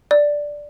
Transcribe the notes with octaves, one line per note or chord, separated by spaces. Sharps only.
D5